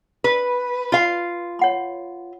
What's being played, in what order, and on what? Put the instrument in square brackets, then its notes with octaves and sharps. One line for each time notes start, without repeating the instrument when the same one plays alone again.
[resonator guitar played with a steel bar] B4
F4 F5
[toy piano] C#5 F#5 B5